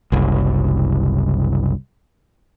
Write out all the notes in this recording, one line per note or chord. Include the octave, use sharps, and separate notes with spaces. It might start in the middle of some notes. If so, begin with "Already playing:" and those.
F#1 C2